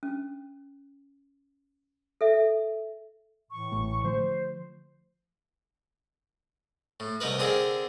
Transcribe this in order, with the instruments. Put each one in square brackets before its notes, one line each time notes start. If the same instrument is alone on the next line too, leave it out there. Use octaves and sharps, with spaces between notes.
[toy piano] C#4
A4 E5
[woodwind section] A2 E3 C#6
[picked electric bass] A1 A3
[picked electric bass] D3 F3 A3 [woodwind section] C5
[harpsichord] A2
C2 D#4 A#4 B4
D3 C4 G#4 A#4 C5